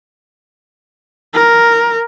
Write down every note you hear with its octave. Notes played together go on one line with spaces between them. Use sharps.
A#4